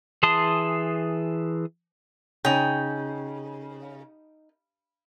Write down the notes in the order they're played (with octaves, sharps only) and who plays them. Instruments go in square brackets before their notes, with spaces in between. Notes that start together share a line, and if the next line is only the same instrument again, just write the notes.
[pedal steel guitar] E3 G#4 A5 C6 D#6
[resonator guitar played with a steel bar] C#3 [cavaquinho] D#4 G5